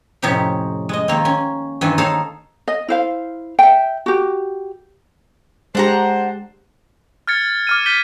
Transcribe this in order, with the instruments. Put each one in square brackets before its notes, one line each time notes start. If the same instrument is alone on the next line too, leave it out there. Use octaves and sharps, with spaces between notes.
[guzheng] F2 A2 C3 C#4 D#4 G4
G#3 D#5
D#3 A#3 C4
C#4
G2 D#3 E3 C4 G#5
D#4 G#4 A4 C#5 F5
[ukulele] D#5
E4 C5 F5
E5 G5
F#4 G4
[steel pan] G#3 G4 [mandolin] D4 F#5 A#5 [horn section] C5
[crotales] F6 G#6 A6 C#7
D6 F6 D#7
G6 G#6 B6 D#7 G7